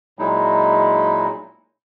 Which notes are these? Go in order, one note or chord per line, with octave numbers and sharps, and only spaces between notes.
A#2 F#3 G#3 D#4 E4